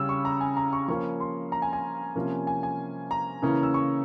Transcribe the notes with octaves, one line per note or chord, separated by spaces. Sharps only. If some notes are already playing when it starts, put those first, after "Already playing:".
Already playing: C#3 G3 C#4 E6
C#6
A#5
G#5
A#5
C#6
F3 A#3 C#4 C#6
C6
A#5
G#5
G#5
C3 F3 A#3 C#4
G#5
G#5
A#5
C#3 E3 A#3 C#4
E6
C#6